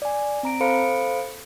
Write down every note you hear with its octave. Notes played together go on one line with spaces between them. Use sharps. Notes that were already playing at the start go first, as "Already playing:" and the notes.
D5 G#5
C4 A#5 D7
A4 C5 F5 B5 C#7 D7